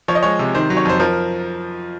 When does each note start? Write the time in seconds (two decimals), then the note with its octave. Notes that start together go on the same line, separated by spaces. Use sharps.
0.08 F3 C#5
0.15 D#5
0.23 G#3 C#5
0.39 C3
0.55 D#3 C5
0.70 F#3
0.77 C#5
0.85 F2 C5
1.00 F3 A#4